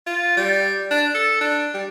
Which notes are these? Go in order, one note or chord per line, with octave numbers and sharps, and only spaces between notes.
F4
G3
D4
A4
D4
G3